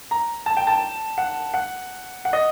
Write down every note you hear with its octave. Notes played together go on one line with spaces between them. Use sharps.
A#5
A5
G5
A5
F#5
F#5
F#5
D#5